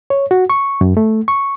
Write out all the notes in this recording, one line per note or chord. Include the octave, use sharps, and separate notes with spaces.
C#5
F#4
C#6
F#2
A3
C#6